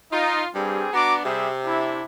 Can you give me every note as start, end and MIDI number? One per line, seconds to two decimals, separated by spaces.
0.12 0.41 63
0.12 0.47 65
0.55 0.85 43
0.55 0.93 55
0.55 0.93 60
0.55 0.93 68
0.94 1.23 59
0.94 1.23 62
0.94 1.16 66
0.94 1.16 82
0.94 1.16 86
1.24 2.05 48
1.24 1.49 55
1.24 1.49 68
1.24 1.49 76
1.65 2.03 62
1.65 2.03 64